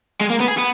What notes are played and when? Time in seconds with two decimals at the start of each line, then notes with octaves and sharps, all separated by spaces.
0.21 G#3
0.30 A#3
0.40 B3
0.48 G#4
0.58 B3